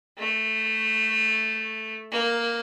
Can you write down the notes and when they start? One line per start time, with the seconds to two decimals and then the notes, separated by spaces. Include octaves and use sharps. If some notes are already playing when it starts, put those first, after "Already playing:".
0.18 A3
2.12 A#3